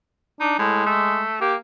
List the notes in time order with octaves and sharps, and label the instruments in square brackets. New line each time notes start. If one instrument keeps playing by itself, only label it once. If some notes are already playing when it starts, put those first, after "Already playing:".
[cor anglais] D4 [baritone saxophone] D#4
[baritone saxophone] A2 [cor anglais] G#3
[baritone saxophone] A3
[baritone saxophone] A#3 [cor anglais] G4